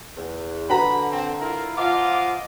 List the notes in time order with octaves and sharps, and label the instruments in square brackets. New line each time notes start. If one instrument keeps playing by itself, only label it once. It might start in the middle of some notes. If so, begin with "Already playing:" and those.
[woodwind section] E2
[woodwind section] D3 [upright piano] F#4 B4 A#5 [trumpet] B5
[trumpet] C4
[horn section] E4 F4 [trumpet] A#4
[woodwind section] F3 F#5 D6 [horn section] F4 [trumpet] D#5